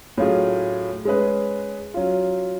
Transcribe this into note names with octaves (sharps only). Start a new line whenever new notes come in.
A2 F#3 C#4 F4 G#4
G#3 C#4 G#4 B4
F#3 C#4 F4